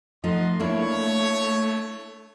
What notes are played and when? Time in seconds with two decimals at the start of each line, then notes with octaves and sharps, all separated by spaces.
0.24 F3 A3 D#4 D#5 F#5 C6
0.60 A3 A#3 D4 E4 C#5